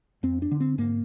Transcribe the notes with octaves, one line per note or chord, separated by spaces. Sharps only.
F2 C4
D4
D3
C4
G#2 A#3